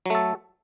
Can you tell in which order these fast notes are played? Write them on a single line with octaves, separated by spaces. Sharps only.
F#3 A3 A4